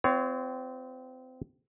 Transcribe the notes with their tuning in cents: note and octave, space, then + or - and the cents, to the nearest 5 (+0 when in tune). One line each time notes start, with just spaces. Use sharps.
C4 -30 F4 -20 C#5 +20